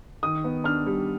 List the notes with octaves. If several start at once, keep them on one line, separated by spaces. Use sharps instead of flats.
D#3 D#6
B3
D4 F6
G3